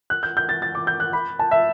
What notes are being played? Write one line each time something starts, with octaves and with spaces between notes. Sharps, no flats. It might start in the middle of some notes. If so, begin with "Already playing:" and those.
F#6
G6
G6
A6
A6
D6
G6
F#6
B5
A5
E5